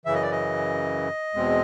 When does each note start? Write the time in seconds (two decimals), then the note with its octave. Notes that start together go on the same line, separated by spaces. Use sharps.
0.05 F#2 C#3 E3 E5
0.14 D#5
0.23 D5
0.31 D#5
1.34 E2 B2 G#3 C4